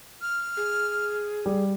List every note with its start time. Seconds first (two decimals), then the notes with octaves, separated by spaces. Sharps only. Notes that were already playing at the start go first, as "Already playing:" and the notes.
0.22 F6
0.57 G#4
1.46 G3